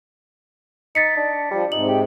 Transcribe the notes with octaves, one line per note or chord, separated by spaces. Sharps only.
D#4 A6 B6 C#7
D4
F3 G3
G#2 C3 D#4 F#7
G4